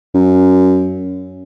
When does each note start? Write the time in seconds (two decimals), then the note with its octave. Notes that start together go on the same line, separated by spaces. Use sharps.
0.14 F#2